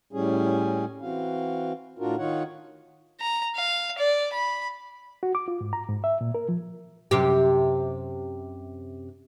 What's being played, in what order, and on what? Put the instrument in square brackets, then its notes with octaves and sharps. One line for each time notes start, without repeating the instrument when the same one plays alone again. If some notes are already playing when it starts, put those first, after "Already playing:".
[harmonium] A2 G3 C#4 G#4
E3 C4 F#4 F5
A2 D4 F4 F#4 A#4
D#3 D#4 F4 C#5 F#5
[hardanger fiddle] A#5
F5
D5
B5
[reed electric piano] F#4
D6
F4
G#2
A#5
G#2
E5
A#2
A#4
F3
[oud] F#2 C3 G4